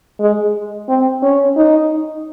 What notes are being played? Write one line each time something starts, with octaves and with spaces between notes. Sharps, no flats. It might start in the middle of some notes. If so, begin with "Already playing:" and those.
G#3
C4
C#4
D#4